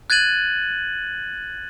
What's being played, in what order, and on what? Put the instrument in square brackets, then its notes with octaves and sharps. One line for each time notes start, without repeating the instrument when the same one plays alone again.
[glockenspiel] F#6 G#6 A6 D#7 F#7